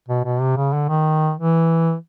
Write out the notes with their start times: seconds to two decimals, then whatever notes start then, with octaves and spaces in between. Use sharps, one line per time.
0.09 B2
0.25 B2
0.41 C3
0.57 C#3
0.73 D3
0.89 D#3
1.37 E3